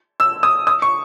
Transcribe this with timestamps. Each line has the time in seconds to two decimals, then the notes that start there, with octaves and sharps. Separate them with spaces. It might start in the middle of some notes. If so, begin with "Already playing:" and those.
0.20 E6
0.43 D#6
0.67 D#6
0.82 C#6